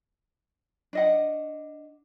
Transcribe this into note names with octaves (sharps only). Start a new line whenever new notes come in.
D4 D#5 F#5